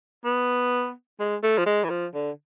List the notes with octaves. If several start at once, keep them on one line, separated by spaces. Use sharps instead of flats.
B3
G#3
A3
F3
G#3
E3
F3
D3